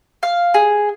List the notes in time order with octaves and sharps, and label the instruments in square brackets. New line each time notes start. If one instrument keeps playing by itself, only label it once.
[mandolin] F5
G#4